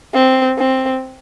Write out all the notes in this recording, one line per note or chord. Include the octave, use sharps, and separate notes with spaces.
C4
C4